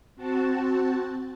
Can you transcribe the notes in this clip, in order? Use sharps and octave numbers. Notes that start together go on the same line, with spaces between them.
C4 F#4 A5